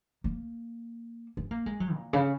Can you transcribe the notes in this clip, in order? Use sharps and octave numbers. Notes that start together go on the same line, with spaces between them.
A#3
C#4
A#3
G#3
F#3
A#2
C#3